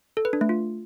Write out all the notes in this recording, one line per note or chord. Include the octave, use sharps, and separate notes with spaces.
A4
B4
D4
A3
F4